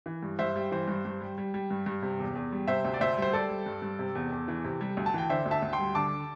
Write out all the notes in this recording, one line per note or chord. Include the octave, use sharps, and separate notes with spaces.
E3
G2
G2 C5 E5
G3
E3 C5
G2
G2
G3
G3
G3
G2
G2
C3
E2
E2
G3
C3 C5 E5
D2
D5
D2 C5 E5
G3
C5
G3 A4 D5
G3
G2
G2
C3
E2
E2
E3
C3
G3
D2
A5
E3 G5
D3 C5 E5
D2
E5 A5
D2
G5 C6
G3
D3 A5 D6